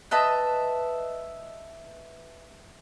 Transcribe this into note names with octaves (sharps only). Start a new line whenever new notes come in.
B4 D#5 E5 A5